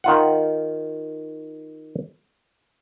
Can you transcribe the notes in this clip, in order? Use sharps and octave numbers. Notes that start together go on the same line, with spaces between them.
D#3 F4 F#5